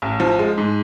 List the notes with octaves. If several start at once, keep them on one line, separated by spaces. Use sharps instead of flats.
A1
F3
G#3
G#2